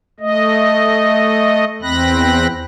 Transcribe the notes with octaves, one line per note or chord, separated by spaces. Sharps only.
A3 D#5
E2 C4 B5 F#6 A#6